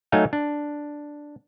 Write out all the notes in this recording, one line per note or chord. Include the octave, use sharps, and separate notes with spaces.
F#3 A3 D#4 F5 G#5
D4